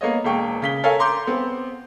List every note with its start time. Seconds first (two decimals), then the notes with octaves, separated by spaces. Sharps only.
0.01 A#3 B3 C#5 D#5
0.24 E1 A#3 G5 C#6
0.62 C#3 B6 G7
0.83 A4 A#4 C#5 F5 G#5
0.99 A#5 C6 D6 G6
1.27 B3 C4